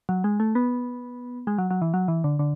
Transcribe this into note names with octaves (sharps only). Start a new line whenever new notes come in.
F#3
G#3
A3
B3
G#3
F#3
F#3
E3
F#3
E3
D3
D3